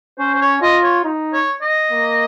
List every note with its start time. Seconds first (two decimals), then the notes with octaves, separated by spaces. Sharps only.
0.19 C#4 C5
0.35 C5
0.41 C#5
0.62 F4 D#5
0.84 C#5
1.05 D#4
1.33 C#5
1.61 D#5
1.91 A#3